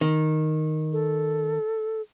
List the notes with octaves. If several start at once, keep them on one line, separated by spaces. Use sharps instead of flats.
D#3
A4